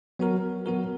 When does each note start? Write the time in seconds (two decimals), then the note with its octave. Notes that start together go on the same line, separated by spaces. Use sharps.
0.19 F#3 B3 F#4 A#4
0.66 F#3 B3 F#4 A#4